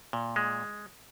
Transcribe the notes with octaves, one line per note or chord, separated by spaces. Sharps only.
A#2
G#3